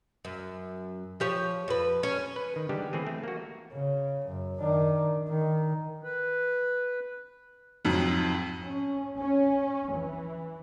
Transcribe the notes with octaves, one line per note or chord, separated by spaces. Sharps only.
F#2
F3 G4 C#5
F2 B4
C#4
B4
D#3
D3 E3 G3 G#3 D4 G4
E3 A3 C4 G#4
A3
A#3 F#4
C#3
F#2
D#3 D4
D#3
B4
F2 G#2 F#3
C#4
C#4
E3